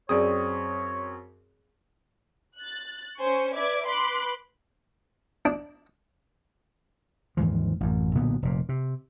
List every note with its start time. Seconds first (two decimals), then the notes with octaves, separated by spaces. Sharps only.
0.09 F#2 C4 G#4 C#5 D5 D#6
2.58 F#6 A6
3.17 C#4 C5 G#5 C#6
3.54 B4 D5 E5 D6 G#6
3.85 B4 B5 C6 D6 F#6
5.45 D4
7.37 D#2 G#2 E3 F3
7.80 A1 F#2
8.15 B1 A#2 D3 B3
8.42 F1 A#2
8.69 C3